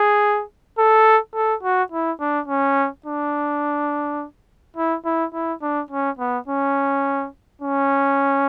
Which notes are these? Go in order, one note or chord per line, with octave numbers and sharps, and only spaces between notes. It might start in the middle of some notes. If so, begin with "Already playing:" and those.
Already playing: G#4
A4
A4
F#4
E4
D4
C#4
D4
E4
E4
E4
D4
C#4
B3
C#4
C#4